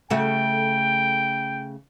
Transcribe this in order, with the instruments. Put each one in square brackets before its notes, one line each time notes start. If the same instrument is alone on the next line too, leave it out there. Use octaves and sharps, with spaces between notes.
[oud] C#3 A3 F#4 [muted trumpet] G5